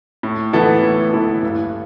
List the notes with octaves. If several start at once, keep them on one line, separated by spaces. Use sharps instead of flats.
A2
E3 B3 E4 A4
A2
E3 B3 E4 A4
G2